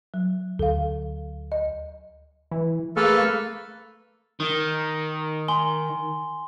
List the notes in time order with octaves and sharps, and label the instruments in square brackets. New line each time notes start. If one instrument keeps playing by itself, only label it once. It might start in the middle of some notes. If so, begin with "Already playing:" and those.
[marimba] F#3
[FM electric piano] D2 [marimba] A4 F5
[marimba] D#5
[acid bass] E3
[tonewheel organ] A3 F5 C#6 [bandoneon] A#3 B4 F6 [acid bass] G#4 [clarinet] A4
[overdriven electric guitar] D#3
[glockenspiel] G#5 C6 G7